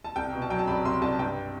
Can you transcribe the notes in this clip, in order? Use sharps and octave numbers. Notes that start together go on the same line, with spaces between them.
A5
C2 G5
B2
A5
F#3 G5
A5
C2 B5
C2 C6
C2 A5
G2 G5